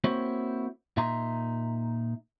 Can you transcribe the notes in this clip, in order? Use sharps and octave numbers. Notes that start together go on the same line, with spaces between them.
A#3 C4 E4 F#4 C5 C#5
A#2 D#4 E5 A#5 C6